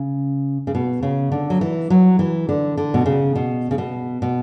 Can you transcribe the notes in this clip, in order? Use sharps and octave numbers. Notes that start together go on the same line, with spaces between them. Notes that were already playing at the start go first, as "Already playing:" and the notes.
Already playing: C#3
C#3
B2
C#3
D3
F#3
E3
F#3
E3
D3
D3
B2
C#3
B2
C#3
B2
B2